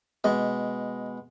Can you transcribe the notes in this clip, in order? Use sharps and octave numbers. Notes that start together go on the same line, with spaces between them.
B2 G#3 D#5